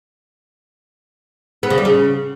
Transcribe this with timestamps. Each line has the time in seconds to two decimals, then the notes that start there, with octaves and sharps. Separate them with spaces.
1.63 B3
1.70 C#3
1.78 G3
1.85 C#3